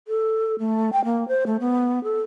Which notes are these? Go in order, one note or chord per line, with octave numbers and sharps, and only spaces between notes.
A4
A3
G5
A#3
C5
A3
B3
A4